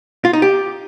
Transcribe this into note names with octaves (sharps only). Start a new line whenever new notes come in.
F4
D#4
G4